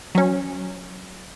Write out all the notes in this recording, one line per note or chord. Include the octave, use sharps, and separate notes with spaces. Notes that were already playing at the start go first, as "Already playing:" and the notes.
F#3 C#4